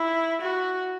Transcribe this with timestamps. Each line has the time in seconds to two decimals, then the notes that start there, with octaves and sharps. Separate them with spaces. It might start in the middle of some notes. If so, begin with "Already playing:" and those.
Already playing: E4
0.41 F#4